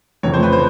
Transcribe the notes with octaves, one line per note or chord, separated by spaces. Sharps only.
F1 F2 C#3 E3 A3 C#5
C5
B4
C5